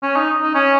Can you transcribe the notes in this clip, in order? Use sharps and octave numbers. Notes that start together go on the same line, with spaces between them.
C#4
D#4
D#4
C#4